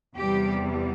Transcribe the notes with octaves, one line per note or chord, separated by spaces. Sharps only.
E2 C3 G3 G4